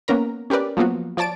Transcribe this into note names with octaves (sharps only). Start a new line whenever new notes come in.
A#3 B3 C#4 A#4 A#5
C#4 G4 A#4 B4 D5
F3 F#3 A#3 B3 F4 F#4
F3 C#5 D5 A5 A6 D7